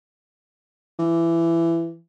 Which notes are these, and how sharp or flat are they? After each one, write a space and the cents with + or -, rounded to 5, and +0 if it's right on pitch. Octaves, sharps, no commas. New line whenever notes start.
E3 +20